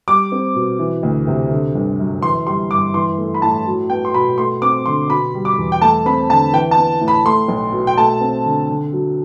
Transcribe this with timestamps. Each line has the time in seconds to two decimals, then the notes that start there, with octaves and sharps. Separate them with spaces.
0.08 G3 D6
0.32 C4
0.55 B2
0.79 E3
1.03 D2
1.27 C3
1.50 D3
1.75 G1
1.99 F#2
2.22 E3 C6
2.47 G3 C6
2.70 G2 D6
2.94 E3 C6
3.18 A3
3.34 B5
3.42 A2 A5
3.67 F#3
3.90 B3 G5
4.05 C6
4.14 B2 B5
4.38 A3 C6
4.62 C4 D6
4.86 D3 C6
5.09 B2 B5
5.34 G3
5.45 D6
5.58 E2
5.72 G5
5.81 A3 A5
6.06 C4 B5
6.30 D3 A5
6.53 E3 G5
6.71 A5
6.77 B3
7.01 A2
7.08 B5
7.25 A3 C6
7.48 B1
7.72 B2
7.87 G5
7.97 A3 A5
8.21 C4
8.45 D3
8.69 D3
8.93 F#3